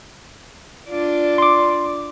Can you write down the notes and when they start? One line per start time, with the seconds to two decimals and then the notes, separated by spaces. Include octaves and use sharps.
0.90 D4 F4 D5
1.38 C6 D6